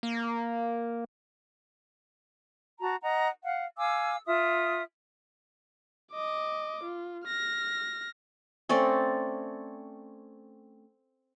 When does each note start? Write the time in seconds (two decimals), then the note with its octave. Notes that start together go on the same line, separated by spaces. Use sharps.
0.03 A#3
2.80 F#4 A5 A#5
3.03 D#5 F#5 A#5
3.43 F5 F#5
3.77 F5 G#5 D6 E6
4.26 F4 E5 D#6
6.12 D#5 D6
6.83 F4
7.25 F6 A#6
8.69 A3 C4 C#4 D5